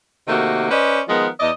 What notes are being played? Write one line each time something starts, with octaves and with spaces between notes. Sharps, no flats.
C3 D#3 A3 A#3 F#4
C#4 B4 C5 D5 D#5
D#3 F3 G#3 B3 A#4
E2 D5 D#5